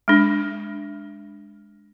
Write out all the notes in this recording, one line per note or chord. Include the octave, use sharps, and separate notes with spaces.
G#3 D4